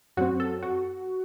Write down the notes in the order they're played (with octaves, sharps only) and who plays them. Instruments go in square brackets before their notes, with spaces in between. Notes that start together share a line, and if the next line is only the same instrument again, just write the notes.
[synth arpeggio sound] F#2 F#3 C4 F#4
A4
F#4